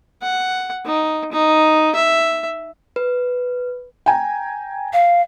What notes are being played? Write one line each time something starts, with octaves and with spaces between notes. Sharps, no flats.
F#5
D#4
D#4
E5
B4
G5 G#5 A#5
F5